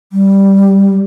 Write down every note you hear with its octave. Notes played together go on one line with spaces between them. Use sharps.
G3